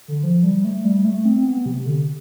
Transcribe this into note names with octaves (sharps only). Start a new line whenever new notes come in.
D3
F3
G3
A3
G3
A3
C4
C4
B3
C3
D3